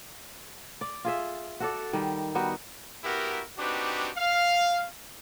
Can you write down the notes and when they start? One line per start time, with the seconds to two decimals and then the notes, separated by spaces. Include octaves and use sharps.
0.81 D5
1.05 F4 G#4 E5
1.60 F#4 A4 D5
1.93 D#3 G3
2.35 G3 B3 D#4 F#4
3.04 B3 E4 F#4 G4 A#4
3.58 C4 D4 D#4 F#4 G4 B4
4.16 F5